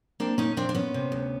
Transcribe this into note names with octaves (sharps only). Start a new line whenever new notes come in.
A#3 C4 D4
A#2 C#4 D#4
A#2 C4 D4
D4
A#2 B3 C#4
C3
D2